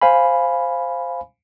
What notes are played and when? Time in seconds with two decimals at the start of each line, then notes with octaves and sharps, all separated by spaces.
0.02 C5 F5 G#5 B5